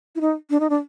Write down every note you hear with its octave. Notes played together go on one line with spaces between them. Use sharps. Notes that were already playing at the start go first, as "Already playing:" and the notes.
E4
D#4
D4
D#4
D4